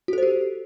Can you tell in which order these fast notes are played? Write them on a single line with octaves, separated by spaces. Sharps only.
F#4 A4 C5 G4